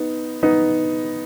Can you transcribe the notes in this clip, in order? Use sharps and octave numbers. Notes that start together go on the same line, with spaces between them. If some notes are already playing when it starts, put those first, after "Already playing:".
Already playing: B3 D#4
B3 D#4